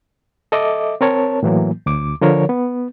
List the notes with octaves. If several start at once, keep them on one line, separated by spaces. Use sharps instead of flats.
A4 D#5 E5 D6
C4 A#4 C#5 A5
A2 E3 F#3 A#3
D2 D6
D3 F3 A#4 C#5
B3